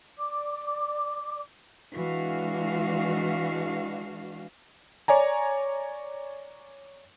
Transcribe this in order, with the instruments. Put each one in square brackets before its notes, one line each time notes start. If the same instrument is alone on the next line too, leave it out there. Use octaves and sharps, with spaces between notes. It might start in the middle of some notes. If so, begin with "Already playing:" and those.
[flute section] D5 D6
[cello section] E3 G#3 D4 F#4 F5
[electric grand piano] C#5 D5 G#5 A#5